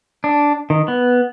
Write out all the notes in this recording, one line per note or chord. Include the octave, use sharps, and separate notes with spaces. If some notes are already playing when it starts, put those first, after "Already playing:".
D4
D#3
B3